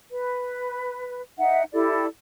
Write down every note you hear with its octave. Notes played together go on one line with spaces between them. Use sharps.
B4
D#4 E5 F#5
E4 G4 A4 D5